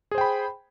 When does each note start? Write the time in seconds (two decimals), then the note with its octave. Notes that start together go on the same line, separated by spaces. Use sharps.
0.11 G#4
0.15 C5
0.18 G5
0.21 B5